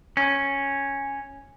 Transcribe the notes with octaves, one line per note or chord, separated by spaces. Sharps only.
C#4